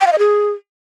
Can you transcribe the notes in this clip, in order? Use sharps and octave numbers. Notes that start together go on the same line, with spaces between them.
G5
F5
D#5
G#4